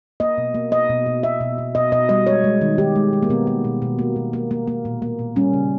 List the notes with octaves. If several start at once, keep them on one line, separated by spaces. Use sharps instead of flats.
A#3 D#5
B2
A#3
A#3 D#5
B2
B2
B2 E5
B2
B2
B2 D#5
B2 D#5
G3 D#5
G#3 C#5
G#3
D#3
D#3 G4
G#3
G#3
A#3
B2 B3
A#3
B2
B2
A#3
B2
A#3
A#3
A#3
A#2
A#3
A#2
G3 C#4
C#3